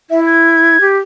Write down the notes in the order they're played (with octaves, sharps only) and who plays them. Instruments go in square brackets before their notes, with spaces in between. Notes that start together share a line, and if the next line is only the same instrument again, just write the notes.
[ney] E4 [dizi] E5
[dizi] G#6
[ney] G4